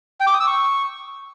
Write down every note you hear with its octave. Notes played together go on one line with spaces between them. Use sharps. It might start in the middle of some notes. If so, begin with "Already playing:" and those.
G5
D6
D#6
E6
C#6